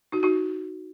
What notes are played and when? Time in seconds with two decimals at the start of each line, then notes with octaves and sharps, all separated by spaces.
0.12 D#4 F#4
0.23 D#4 F#4